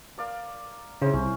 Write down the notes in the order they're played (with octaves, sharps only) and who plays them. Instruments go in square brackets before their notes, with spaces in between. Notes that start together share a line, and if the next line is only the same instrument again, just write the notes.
[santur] A#4 D5 F5
[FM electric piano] C#3 [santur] E4 C5
[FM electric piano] C2 [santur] C#4